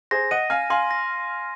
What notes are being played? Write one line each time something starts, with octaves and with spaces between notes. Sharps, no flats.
G#4 C5 A#6
D#5 F#5 D#7
F5 G#5 F6
F5 G#5 C6
A#6